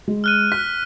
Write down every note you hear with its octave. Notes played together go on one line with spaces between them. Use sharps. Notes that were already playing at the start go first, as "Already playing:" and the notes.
G#3
F6 F#6 D#7
F#6 B6